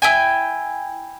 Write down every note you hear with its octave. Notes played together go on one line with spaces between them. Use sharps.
E4 G5 G#5